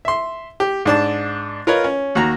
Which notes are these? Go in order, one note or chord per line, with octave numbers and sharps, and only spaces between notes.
E5 C6
G4
G#2 D4 A5
F4 A#4 B4 C#5 D#5
C#4
D#2 F#4 A#5